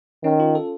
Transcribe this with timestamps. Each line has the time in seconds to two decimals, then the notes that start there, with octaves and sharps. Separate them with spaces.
0.24 D#3 C#4
0.40 F4
0.55 A4